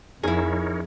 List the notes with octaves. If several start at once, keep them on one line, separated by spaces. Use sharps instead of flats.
F2 D#4 E4 G#4 A#4 C#5